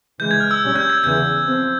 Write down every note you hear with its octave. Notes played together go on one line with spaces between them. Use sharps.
C#3 E3 G#3 G6
G#6
F6
E6
A#2 G3 C#4
G6
G#6
E2 C#3 E3 G6
F3 C4